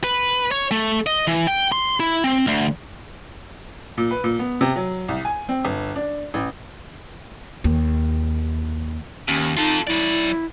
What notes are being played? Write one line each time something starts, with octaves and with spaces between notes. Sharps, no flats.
B4
C#5
A3
D#5
E3
G5
C6
E4
C4
D2
A#2
B4
A#2
B3
C3
F#3
C2
G#5
C4
G1
D4
A1
D#2
D#2 C#4
D#4 F4 A4
F#3 E4 D5